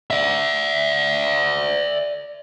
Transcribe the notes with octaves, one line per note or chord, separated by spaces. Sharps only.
D5 E5